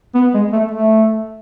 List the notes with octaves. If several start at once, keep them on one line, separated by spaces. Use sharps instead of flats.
B3
G#3
A3
A3